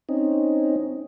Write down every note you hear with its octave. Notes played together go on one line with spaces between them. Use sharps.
C4 C#4 D#4